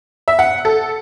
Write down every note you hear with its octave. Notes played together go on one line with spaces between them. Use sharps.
E5
F#5
A4